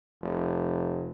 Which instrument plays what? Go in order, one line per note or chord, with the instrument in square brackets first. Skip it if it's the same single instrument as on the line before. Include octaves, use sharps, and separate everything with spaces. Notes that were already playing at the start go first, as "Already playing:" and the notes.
[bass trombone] F1